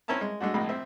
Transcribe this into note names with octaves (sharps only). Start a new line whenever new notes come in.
C4 C#4 E4 E5 A5 A#5
G#3
G#3 A3 D4 F#4
A#1 A2 C3 G#3 B5
C4 E5